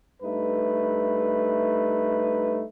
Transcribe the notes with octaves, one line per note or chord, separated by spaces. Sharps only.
G2 A3 D#4 B4